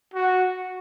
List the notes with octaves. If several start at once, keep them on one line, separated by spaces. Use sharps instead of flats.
F#4